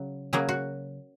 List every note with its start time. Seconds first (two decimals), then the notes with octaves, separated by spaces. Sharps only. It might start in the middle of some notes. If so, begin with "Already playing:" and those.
Already playing: C#3 F#3
0.33 C#3 F#3 A#3 G#4
0.49 F#4